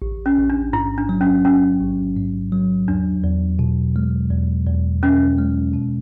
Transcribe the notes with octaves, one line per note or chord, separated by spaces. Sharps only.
A1
C#4
A1
D4
G#2 E4
D4
F#3
C#4
A1 C#4
A1
G#2
F#3
E2 D4
E2
B2
G#3
E2
E2
B2 C#4
G#3
B2